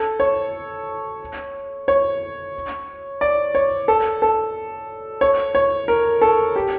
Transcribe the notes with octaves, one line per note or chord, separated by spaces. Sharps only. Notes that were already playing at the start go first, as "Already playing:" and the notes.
Already playing: A4
C#5
C#5
D5
C#5
A4
A4
C#5
C#5
A#4
A4
G4